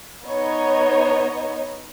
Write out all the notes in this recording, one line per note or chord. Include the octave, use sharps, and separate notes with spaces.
B3 D#4 C#5 D#5